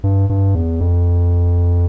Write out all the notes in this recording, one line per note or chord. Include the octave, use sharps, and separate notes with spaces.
G2
G2
E2
F2